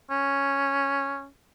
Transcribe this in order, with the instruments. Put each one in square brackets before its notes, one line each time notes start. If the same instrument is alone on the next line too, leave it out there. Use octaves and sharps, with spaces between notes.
[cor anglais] C#4